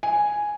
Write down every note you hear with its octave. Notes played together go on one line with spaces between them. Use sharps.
G#5